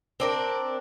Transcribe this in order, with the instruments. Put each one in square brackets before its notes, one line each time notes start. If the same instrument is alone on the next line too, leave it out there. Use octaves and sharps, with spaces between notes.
[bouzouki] C4 D4 A#4